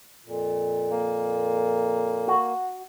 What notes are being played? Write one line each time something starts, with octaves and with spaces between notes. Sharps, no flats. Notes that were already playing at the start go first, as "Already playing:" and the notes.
F2 A#2
A#3
F#4